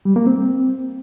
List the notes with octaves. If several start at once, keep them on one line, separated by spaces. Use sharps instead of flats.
G3
A#3
C4